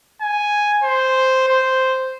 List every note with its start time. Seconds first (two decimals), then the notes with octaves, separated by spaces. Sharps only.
0.21 G#5
0.83 C5
1.48 C5